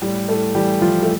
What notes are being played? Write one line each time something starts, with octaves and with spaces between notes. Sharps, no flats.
A2 G3 G4
A2 A3 A4
E3 G3 G4
E3 F3 F4
A3